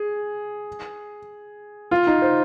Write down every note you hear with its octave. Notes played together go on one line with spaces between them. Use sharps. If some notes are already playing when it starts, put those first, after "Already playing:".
Already playing: G#4
F4
D#4
C5